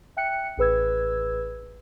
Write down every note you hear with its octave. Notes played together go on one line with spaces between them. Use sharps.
E5 G5 F#6 C#7
A1 G#4 B4 E6 G#6